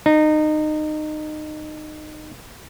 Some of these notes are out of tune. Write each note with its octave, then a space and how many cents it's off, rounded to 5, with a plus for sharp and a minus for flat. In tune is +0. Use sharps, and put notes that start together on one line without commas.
D#4 -25